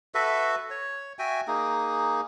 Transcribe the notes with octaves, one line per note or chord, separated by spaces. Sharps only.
F#4 A4 B4 E5
C#5
F#4 E5 G5 G#5
A#3 D#4 G#4